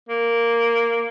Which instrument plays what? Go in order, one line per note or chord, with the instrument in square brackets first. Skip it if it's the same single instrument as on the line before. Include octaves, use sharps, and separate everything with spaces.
[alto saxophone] A#3